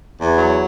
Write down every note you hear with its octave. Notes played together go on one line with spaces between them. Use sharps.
E2
F#3